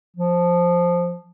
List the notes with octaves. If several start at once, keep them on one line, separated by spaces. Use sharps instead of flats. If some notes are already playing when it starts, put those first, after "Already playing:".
F3